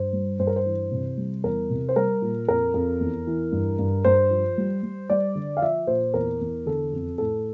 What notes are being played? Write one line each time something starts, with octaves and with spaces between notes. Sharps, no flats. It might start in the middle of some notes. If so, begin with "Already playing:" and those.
Already playing: G2 C5
G3
G2 C5
A#4
C5
E3
C3
G3
E2 A#4
C3
C5
G3 A#4
A#2
F2 A#4
F2
E2
E3
G2
G2
G2 C5
F3
G3
G3
G3 D5
D3
F5
F3 E5
A#2 C5
E2 A#4
E2
D3 A4
F2
A2 A4